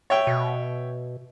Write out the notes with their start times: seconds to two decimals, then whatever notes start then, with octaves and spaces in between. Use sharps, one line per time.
0.10 C#5 E5 G5
0.27 B2